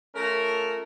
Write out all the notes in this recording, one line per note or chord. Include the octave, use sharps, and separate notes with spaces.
A3 C#4 F4 A#4